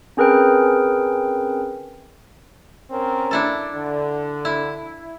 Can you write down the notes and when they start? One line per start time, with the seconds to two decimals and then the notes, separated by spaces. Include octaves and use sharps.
0.17 C4 C#4 G#4 A#4 B4 G5
2.91 C4 C#4 A#4
3.31 D4 E4 A4
3.75 D3
4.45 E4